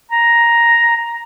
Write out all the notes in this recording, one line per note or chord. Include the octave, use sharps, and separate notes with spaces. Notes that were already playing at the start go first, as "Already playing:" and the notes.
A#5